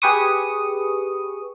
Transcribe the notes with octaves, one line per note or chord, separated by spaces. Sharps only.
G4 G#4 B4 C#6 D#6